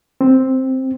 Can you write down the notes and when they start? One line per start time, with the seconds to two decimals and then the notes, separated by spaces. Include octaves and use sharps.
0.21 C4